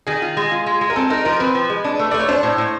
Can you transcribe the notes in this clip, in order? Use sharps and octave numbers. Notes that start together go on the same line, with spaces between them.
D#3 G#4
F4
G#3
F4
G#3
G#3
A#4
C4 A4
D#4 A#4
F3 A#4
C4 B4
F3
G#3
D4
A3
A3 D5
C#5
D4 C5
A2
A2